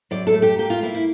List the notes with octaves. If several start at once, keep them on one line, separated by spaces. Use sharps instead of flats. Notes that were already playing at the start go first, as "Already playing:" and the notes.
F#2 D5
A4
A3
G4
A#3 G4
F4
A#3 E4
E4